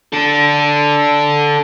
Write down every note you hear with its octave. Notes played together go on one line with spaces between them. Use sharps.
D4 A4